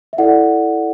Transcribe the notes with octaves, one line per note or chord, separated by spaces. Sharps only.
E5
E4 A4 D5 F#5